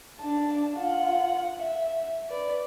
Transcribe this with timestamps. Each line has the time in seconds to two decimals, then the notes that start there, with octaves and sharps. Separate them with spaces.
0.21 D4 A5
0.77 F4 F#5
1.58 E5
2.29 B4 D5